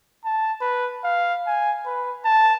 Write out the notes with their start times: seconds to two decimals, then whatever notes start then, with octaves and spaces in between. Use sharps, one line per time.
0.25 A5
0.61 B4
1.04 F5
1.47 G#5
1.86 B4
2.25 A5